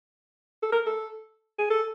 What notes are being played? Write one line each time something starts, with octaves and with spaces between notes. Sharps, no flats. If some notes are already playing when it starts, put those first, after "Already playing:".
A4
A#4
A4
G#4
A4